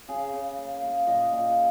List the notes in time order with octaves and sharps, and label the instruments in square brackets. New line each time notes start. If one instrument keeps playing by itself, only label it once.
[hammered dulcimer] C#3 G#4
C#3
A#3
A#3
A#2 D#5
A#2